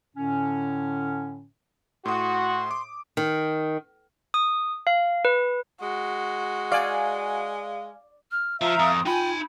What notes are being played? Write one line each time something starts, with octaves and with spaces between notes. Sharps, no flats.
A2 D3 C#4
A2 F#4 C6 D#6
D6
D#3
D#6
F5
B4
G#3 F#4
D5 F5 G#5
F6
F3 F4 E5 F5 A#5
F2 D#6
D#4 F4 G5 G#5 B5